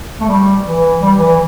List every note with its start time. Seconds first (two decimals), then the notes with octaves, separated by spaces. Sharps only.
0.21 A3
0.29 G3
0.65 E3
1.01 G3
1.19 E3